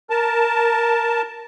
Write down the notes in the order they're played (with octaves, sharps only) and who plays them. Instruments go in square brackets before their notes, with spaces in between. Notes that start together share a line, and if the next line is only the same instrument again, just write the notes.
[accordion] A#4 A5